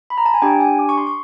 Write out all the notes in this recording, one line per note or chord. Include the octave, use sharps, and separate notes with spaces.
B5
A#5
A5
G#5
D4 G4 G5
G#5
D6
C#6
C6
C#6